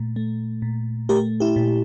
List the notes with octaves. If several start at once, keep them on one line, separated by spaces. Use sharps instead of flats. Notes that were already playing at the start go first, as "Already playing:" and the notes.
Already playing: A#2 A3
A3
A#2
A3 G4 A#4
E4 G4
A#2